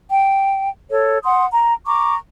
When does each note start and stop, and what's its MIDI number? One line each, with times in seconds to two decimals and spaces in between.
0.10 0.69 79
0.90 1.18 69
0.90 1.18 73
1.24 1.46 78
1.24 1.46 84
1.24 1.46 87
1.51 1.74 82
1.87 2.15 82
1.87 2.15 85
1.87 2.15 86